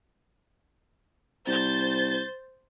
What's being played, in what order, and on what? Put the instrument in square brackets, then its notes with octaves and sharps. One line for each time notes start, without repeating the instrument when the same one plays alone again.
[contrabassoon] C2 [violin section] C5 G6 A6